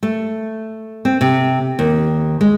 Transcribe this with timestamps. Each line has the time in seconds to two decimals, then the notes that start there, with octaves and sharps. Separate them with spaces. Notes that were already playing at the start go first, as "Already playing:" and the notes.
0.03 A3
1.05 C4
1.21 C3
1.79 D#2
2.41 G#3